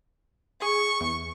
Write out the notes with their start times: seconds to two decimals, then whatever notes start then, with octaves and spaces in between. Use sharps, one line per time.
0.62 G#4 C#6
1.01 E2